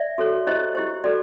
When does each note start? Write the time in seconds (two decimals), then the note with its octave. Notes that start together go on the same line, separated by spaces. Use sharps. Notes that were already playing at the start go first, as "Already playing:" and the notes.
Already playing: D5 E5
0.18 F#4 A4 C#5
0.47 E4 G4 C5 C#5 D#5
0.75 E4 G4 C5
1.04 F#4 A4 D5